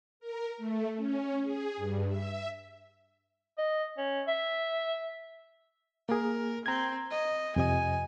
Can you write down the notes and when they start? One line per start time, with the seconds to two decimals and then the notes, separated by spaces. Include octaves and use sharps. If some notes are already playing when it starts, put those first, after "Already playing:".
0.20 A#4
0.57 A3
0.96 C#4
1.42 G#4
1.77 G2
2.07 E5
3.58 D#5
3.97 C#4
4.28 E5
6.09 A#3 G#4 A#4
6.66 C4 A#5 G#6
7.11 D#5
7.56 F2 C3 D#5 G#5